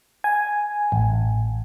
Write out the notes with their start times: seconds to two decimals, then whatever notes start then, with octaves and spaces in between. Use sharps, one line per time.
0.24 G#5
0.92 A1